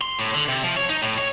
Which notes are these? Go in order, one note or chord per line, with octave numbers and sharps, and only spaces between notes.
C6
A2
D3
C3
F3
C#5
D#4
A2
C#5